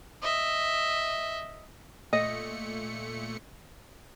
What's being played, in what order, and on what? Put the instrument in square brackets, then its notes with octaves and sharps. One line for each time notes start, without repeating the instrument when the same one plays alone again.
[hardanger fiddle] D#5 E5
[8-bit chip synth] A#2 A3 C#7 [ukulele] D#5